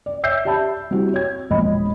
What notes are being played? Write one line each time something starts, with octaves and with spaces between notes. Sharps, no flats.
D5
C#5 E5 E6 G6 C7
G4 D5 E5 A5 B5
G3 C4 E4 F#4 G4
C#5 G#6
E1 A#1 D#5 B5